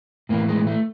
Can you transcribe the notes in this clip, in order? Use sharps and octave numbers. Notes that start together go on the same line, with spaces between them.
A2 E3 A#3
G#3
A3